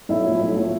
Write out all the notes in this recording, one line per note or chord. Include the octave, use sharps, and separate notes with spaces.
B1 E4
A2 F3
B1
A2 F3